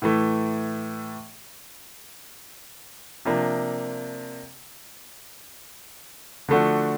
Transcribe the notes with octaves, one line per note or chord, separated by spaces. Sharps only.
A2 E3 A3
C3 F3 A#3 D4
D3 F3 A3 D4 F#4